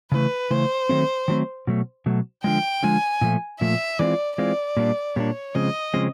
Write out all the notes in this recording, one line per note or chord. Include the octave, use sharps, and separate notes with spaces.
C#3 E3 A3 B4
C#3 E3 A3 C5
D#3 F#3 A3 C4
D#3 F#3 A3 C4
B2 F#3 A3
B2 F#3 A3
D3 F3 G#3 G5
D3 F3 G#3 G#5
A#2 F3 A3
A#2 F3 A3 E5
E3 G#3 C4 F4 D5
E3 G#3 C4 F4 D5
A#2 G3 A#3 D4
A#2 G3 A#3 D4 C#5
C#3 F3 G#3 C4 D#5
C#3 F3 G#3 C4